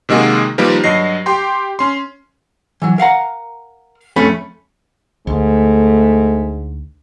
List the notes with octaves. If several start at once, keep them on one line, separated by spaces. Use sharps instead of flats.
C3 D#3 G#3 A#3 F#4 G#4
D#3 F3 G3 A#3 A#4 B4
G2 F#3 D#5 A#6 C7
G4 G5 C6
C#4 C6
E3 F#3
A#4 F5 F#5 A#5
F2 A3 C#4 B5
D2 G#2 A3